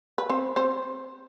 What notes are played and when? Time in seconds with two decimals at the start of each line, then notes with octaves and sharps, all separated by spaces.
0.18 B4
0.29 C4 C5
0.56 C4 C5